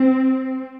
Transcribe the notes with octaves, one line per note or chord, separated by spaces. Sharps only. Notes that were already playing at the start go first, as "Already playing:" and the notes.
Already playing: C4